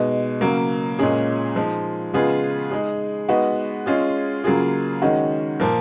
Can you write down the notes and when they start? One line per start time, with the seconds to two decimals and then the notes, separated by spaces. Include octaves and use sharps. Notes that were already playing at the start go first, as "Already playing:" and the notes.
Already playing: B2 G#3 D#4
0.41 C#3 F#3 A#3
0.99 A#2 G#3 C#4 G#4
1.56 F3 G#3 D#4
2.14 C#3 G#3 B3 F4 G#4
2.71 G#3 D#4 G#4
3.28 G#3 B3 D#4 F#4
3.86 G#3 C#4 F4 G#4
4.44 C#3 F#3 A#3 F4 G#4
5.02 D#3 G#3 C#4 F#4
5.60 A#2 F3 A#3